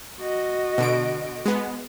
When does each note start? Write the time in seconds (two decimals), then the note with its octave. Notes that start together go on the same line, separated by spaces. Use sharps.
0.21 F#4 D#5
0.78 B2 D3 D7
1.46 G#3 B3